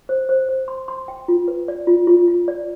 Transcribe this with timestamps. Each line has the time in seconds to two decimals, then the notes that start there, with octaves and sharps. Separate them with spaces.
0.09 C5
0.29 C5
0.49 C5
0.68 C6
0.88 C6
1.08 G5
1.28 F4
1.48 B4
1.68 D5
1.87 F4
2.07 F4
2.28 F4
2.48 D5